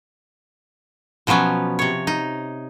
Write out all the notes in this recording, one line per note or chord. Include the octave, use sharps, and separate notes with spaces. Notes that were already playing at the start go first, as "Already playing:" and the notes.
B2 F3 F#3 B3 C#4
C3 C#5
D#4